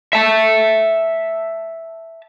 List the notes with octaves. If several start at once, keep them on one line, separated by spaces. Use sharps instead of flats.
E5 A5